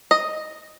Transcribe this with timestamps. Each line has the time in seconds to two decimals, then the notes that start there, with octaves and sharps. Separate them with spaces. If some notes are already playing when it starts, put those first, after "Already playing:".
0.11 D#5